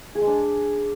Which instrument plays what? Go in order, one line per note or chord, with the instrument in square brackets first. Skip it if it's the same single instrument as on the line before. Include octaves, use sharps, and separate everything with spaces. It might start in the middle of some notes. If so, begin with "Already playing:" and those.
[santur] G#4
G#3
D4